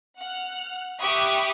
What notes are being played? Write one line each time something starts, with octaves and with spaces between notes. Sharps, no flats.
F#5 F6 F#6
G4 E5 B5 C#6 D#6 F#6